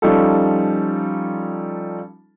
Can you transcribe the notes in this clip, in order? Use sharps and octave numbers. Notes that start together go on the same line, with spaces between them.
F3 G3 C#4 D#4 F4 A4